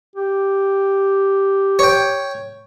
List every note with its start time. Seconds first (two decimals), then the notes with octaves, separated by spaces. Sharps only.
0.16 G4
1.79 C#5 G5